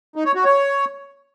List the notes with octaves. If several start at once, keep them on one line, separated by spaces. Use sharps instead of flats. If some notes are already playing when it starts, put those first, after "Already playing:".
D#4
C#5
F#4
C#5